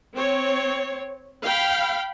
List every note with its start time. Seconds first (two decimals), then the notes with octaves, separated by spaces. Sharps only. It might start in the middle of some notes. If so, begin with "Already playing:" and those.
0.16 C4 C#5
1.44 F5 G5 B5